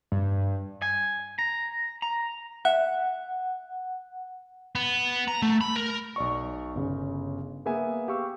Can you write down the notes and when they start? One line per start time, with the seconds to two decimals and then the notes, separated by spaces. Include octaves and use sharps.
0.12 G2
0.82 G#5
1.39 A#5
2.02 A#5
2.65 E5 F#5
4.75 B3
5.28 A#5
5.42 A3
5.61 B5
5.76 A#4
6.16 B1 D5 C#6
6.75 G1 C#3
7.66 A#3 B3 G#4 E5 G#5
8.08 G4 F5 C#6 E6